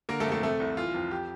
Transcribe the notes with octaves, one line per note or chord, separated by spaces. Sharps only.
D3 A#3 A#4
A3 A4
F2
A3 A4
C3 A3 A4
C2
E3 F4
F2
G4